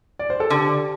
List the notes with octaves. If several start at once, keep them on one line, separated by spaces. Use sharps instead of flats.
D5
C5
A4
D3 G4